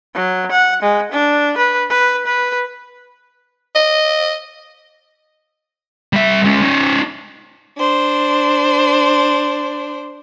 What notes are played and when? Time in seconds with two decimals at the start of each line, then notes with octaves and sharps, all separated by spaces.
0.15 F#3
0.51 F#5
0.83 G#3
1.12 D4
1.58 B4
1.90 B4
2.26 B4
3.75 D#5
6.13 G3 E5
6.45 G#3 C#4
6.62 C#4 D#4
7.78 D4 C5